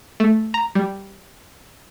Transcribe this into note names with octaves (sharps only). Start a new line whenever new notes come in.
A3
A#5
G3